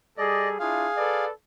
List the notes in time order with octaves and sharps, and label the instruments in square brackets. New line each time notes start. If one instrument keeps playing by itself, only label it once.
[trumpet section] G3 G#4 A4 [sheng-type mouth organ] D5 D#5
[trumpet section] D4 E4 F4 [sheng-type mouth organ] G#4 F5
[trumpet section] A4 B4 D5